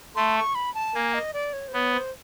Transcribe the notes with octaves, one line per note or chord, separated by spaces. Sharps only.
A3 C6
C#6
B5
A5
A#3 G#5
D#5
D5
C#5
C5
B3 C#5
C5